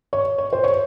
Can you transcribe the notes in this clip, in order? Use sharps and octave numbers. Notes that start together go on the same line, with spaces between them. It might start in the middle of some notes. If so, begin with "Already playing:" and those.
C#5
C#5
C5
C#5